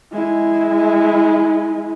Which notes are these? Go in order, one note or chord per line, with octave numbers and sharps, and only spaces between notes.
G#3 E4